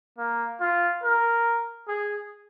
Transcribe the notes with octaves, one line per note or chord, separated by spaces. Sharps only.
A#3
F4
A#4
G#4